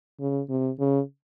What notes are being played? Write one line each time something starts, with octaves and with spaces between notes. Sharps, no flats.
C#3
C3
C#3